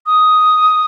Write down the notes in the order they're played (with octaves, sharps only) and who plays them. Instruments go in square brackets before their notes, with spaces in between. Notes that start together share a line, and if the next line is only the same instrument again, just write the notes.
[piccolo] D#6